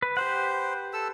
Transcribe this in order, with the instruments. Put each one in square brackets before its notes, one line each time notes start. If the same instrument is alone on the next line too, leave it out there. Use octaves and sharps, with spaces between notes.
[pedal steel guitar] B4
[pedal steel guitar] G4 B4 F#5 [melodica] C5
[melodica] A4 E6